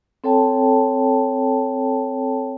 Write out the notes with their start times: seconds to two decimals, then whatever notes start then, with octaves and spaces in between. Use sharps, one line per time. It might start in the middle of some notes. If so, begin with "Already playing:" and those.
0.24 C4 A4 C#5 G5 A5